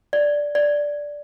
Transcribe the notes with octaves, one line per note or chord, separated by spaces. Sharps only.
D5
D5